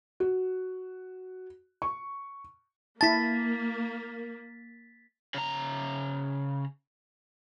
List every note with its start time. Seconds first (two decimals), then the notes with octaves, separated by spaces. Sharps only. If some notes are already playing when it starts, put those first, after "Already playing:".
0.20 F#4
1.82 C#6
3.01 A#3 E4 A5 A6 B6
5.34 C#3 A#5